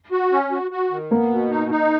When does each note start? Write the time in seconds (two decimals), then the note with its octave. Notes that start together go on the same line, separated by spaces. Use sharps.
0.12 F#4
0.32 C#4
0.52 F#4
0.71 F#4
0.91 D#3
1.11 A#3 B3
1.31 B2
1.50 D#4
1.71 D#4